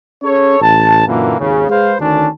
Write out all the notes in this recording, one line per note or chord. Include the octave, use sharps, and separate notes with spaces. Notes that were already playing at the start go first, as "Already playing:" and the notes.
C#4 G#4 A4 C#5
A1 A5
F#2 A#2 D3 E3 A#3
G#1 D#2 C#3
G#3 G#4 B4 C5 F5
D2 D#3 C#4 D4 A5